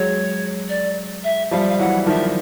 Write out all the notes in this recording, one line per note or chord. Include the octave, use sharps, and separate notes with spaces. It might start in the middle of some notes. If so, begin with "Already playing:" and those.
Already playing: F#3 G#3 C#5
D5
E5
F3 G3 F5
E5
F5
E3 F#3 F#5
D#3 F3 E5